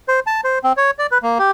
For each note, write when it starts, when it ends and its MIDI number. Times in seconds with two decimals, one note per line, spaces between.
0.08 0.20 72
0.27 0.41 81
0.44 0.59 72
0.64 0.73 60
0.77 0.91 73
0.99 1.07 74
1.11 1.18 71
1.23 1.38 58
1.39 1.51 67